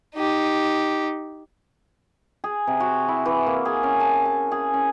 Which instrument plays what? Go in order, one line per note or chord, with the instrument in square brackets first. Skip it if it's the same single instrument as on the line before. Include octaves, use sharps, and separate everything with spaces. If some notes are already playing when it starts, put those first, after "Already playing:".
[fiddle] D#4 G4
[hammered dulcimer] G#4
C3
F#4
E4
E3
A#3
G#4
C#4
A5
G#5
G#4
C#4